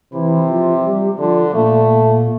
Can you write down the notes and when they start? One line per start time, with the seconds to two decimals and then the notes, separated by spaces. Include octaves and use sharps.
0.13 C3 E3 E4
0.49 F3 F4
0.84 G3 G4
1.19 D3 F3 F4
1.53 A#2 A3 A#3